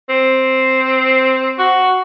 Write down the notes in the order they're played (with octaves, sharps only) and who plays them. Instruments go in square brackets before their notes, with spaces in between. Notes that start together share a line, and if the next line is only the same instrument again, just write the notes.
[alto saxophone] C4
F#4